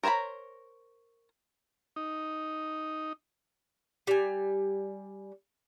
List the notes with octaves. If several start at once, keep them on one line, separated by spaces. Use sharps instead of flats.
A#4 C5 C#5 A#5 B5
D#4
G3 G#5